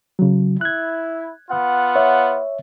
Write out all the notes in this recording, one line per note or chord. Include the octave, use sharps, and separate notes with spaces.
C#3 F#3
E4 F#6 G#6
B3 F4 F#5
C#5 E5